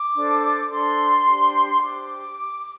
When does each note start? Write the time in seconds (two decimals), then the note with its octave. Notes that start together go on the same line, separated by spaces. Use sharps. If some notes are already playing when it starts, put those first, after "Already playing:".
Already playing: D6
0.14 D4 A4 C5
0.70 D4 A4 C5 C6
1.25 D4 G4 C5
1.80 D4 G4 C5 D6